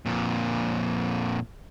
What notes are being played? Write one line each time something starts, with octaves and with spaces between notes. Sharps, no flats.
F2 A#2